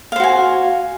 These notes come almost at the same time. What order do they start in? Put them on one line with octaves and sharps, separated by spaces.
F5 C5 F#4 G#5